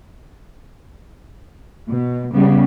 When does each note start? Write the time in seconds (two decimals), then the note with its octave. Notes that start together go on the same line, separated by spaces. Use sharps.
1.89 B2
2.32 C#3 G3 B3